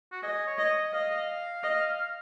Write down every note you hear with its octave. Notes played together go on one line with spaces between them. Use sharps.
F#4
G#4 D#5
C#5
D#5
C#5
D#5
D#5 F5
D#5